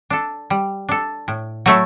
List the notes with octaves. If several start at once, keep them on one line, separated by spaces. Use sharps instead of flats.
D4 A4
G3
D4 A4
A2
F#3 A3 E4 A4